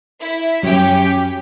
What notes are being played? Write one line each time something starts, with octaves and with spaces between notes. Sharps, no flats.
E4
F#2 F#3 C#4 G4 G5